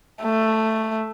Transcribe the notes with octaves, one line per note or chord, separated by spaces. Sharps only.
A3